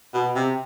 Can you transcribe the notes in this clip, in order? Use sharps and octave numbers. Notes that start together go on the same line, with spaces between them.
B2
C3